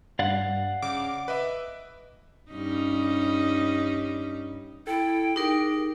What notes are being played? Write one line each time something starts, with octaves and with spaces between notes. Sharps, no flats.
G2 D5 F5 F#5
C#3 D6
B4 D#5 E5
G2 C#4 D#4
E4 A4 G5
D#4 G4 G#4 A#4